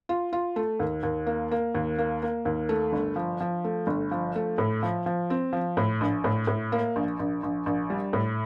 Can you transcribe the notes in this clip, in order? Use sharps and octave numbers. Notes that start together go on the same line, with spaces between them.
F4
F4
A3
D#2
D#2
A#3
A#3
D#2
A#3
A#3
D#2
A3
G1
F3
F3
A3
G1
F3
A3
A2
F3
F3
C4
F3
A2
A#1
A2
A2
A#3
A#1
A#1
A#1
A#1
G3
A2